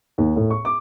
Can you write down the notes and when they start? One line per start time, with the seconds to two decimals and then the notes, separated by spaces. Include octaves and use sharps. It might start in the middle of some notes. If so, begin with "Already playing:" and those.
0.18 D#2
0.36 A2
0.51 C#6
0.65 D6